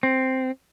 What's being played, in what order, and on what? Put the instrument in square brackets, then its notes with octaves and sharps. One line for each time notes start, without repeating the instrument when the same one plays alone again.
[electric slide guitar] C4